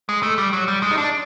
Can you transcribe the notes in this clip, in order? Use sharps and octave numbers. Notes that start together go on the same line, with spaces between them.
G#3
A3
G3
F#3
G3
G#3
D#4
D4